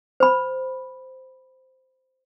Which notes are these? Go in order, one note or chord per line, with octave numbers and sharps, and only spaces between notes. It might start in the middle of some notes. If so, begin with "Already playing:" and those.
C5 B5